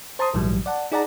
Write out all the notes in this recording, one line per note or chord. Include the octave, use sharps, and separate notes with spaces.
C5 A5 A#5 C6 D#6
A#1 G#2 E3 F#3 G3
D5 F#5 A5
D#4 G#4 D5 F#5 A5 A#5